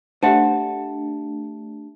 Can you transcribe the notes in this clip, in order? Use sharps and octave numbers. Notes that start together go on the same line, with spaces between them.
A3 D4 G4 C5 E5 F#5 A5